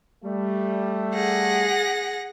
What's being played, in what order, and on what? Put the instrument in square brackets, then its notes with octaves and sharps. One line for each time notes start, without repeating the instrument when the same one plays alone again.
[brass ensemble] G3 A3
[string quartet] G#4 F#5 A#6